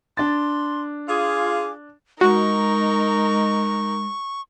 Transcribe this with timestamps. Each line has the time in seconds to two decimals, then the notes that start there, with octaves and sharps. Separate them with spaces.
0.17 D4 C6 A6
1.09 F4 G#4 D6
2.21 G#3 D#4 F#4 A#4 C#6